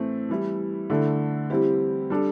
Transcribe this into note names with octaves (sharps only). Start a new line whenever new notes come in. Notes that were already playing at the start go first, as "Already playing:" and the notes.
Already playing: A2 E3 A3 C4
E3 G3 E4
D3 A3 E4 A4
E3 G3 C4 E4 G4
G3 D4 A4